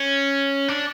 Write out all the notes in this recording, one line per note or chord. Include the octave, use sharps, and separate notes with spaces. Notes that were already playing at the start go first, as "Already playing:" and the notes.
Already playing: C#4
D4